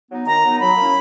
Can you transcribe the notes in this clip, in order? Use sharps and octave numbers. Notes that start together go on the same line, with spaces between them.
F#3 B3 D#4
D#3 A#5
F#3 B3 D#4
F#3 B5
A#3 C#4 E4